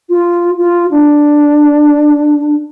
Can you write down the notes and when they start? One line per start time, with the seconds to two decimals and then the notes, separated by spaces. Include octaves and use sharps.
0.09 F4
0.58 F4
0.91 D4